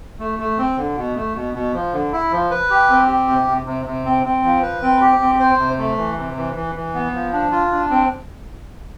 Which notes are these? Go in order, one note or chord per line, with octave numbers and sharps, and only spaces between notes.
A3
A3
C4
D3
B2
A3
B2
B2
F3
D3
E4
F3
B4
G4
C4
G4
C3
C3
C3
C3
C4
C4
F3
B4
C4
G4
C4
C5
C3
A3
E3
C3
E3
E3
E3
B3
F3
D4
F4
D4
C4